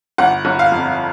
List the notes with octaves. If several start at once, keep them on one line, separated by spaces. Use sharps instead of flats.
G1 F#5
G1
F5
F2